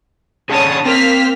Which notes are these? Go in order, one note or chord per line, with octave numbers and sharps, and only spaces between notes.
C#4 D4 G#4 C#5 A5 D#6
A#3 C4 F6 B6